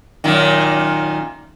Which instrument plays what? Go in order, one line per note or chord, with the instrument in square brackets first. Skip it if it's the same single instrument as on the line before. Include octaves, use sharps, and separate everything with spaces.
[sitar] F#2 A#2 D#3